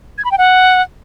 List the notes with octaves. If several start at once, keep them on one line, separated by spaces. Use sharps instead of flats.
G#6
B5
G5
F#5